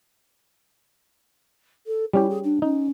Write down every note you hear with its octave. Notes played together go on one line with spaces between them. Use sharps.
A4
G3 C#4 E4 G4
G#4
D4
C#4 D#4